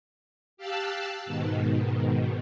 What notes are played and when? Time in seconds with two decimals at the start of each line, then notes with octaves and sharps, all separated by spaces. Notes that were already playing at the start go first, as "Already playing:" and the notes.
0.57 G4 F5 A5 E6 F#6
1.26 G#2 B2 D#3